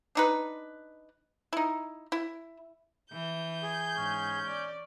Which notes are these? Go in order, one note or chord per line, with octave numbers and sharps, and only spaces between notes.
D4 D#4 B4
D#4 E4
E4
E3 G6
G#4
G#2 C#4
D5